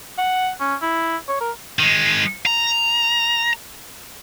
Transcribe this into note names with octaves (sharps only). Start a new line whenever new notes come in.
F#5
C#4
E4
C#5
A#4
D#3 G#3
A#5